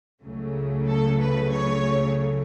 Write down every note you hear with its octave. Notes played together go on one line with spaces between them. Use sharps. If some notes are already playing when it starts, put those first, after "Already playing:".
C#2 C#3 F#3 A3
A4
B4
C#5